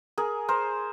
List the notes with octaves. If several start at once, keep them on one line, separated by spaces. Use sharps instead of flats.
G#4 A#4
A#4 C5